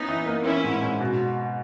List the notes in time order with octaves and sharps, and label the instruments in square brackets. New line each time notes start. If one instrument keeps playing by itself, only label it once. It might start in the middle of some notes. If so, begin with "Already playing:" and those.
Already playing: [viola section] B3 D#4 [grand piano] C#4 E4
[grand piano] E3
A#3
[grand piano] E3 [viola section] C#4 E4
[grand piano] G#2
G#2
B2